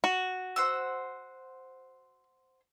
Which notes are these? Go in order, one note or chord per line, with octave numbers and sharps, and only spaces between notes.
F#4
C5 F#5 E6